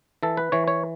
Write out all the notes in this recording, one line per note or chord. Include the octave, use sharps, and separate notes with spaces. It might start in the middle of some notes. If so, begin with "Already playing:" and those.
E3 A4
B4
E3 C#5
C#5